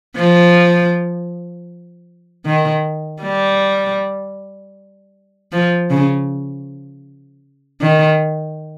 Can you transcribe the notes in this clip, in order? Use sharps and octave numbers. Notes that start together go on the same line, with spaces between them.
F3
D#3
G3
F3
C#3
D#3